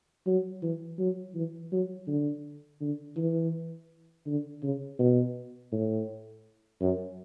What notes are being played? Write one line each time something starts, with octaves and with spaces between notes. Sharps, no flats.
F#3
E3
F#3
E3
F#3
D3
D3
E3
D3
C#3
B2
A2
F#2